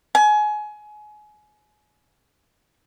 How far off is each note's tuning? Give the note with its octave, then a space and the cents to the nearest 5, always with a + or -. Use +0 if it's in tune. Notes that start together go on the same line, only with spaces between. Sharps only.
G#5 +25